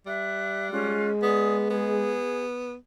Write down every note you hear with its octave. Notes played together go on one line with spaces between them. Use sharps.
G3 E5 F#6
G#3 C#4 F4 F#6
B3 G#4 D5 D#6
B3 G#4